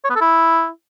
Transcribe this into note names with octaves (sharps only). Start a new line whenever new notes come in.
C#5
B3
A4
E4